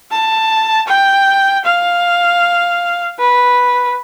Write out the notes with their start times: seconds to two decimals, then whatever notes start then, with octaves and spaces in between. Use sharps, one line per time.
0.11 A5
0.88 G5
1.65 F5
3.20 B4